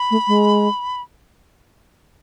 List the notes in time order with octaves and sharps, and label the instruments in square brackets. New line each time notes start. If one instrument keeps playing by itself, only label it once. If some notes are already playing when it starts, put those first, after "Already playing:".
Already playing: [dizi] B5
[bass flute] A3
G#3